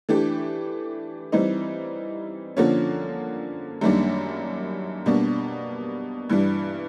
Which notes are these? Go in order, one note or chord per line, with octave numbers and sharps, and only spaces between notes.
E3 A3 D4 G4
E3 G3 C4 D#4
D3 F3 A#3 C#4
F#2 D#3 G3 A#3 D4
B2 G3 A#3 D4
G2 E3 G3